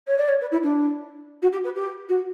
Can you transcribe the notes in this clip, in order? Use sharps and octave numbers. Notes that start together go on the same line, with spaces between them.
C#5
D5
C#5
B4
E4
D4
F#4
G4
B4
G4
F#4